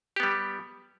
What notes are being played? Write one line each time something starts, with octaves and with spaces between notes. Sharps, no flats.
G3 B3 G4